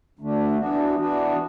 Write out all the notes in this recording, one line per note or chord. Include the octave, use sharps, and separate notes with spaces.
D2 D3 A3 D4
E3 B3 D4 F#4
E3 B3 D4 F#4